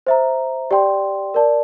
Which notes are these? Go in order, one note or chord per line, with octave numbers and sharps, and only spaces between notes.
C5 E5 A#5
G4 D5 G5 C6
A#4 D5 A5